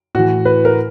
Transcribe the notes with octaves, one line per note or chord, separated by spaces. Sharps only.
A2 E3 F#4
B4
A#4